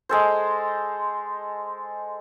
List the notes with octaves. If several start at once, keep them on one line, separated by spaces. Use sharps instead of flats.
G#3 A4 C5